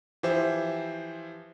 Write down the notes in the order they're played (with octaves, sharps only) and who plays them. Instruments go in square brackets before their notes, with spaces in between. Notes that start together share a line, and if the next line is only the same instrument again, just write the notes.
[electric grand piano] E3 F3 G4 C5 E5